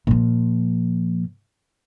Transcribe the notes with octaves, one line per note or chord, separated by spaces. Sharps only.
A#2 F3